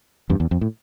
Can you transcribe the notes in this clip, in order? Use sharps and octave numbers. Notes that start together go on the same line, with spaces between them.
E2 G2
E2
F2
A2